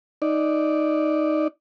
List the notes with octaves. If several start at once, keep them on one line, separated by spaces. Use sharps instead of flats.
D#4 D5